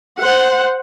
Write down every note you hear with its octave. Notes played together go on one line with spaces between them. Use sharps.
C5 F#5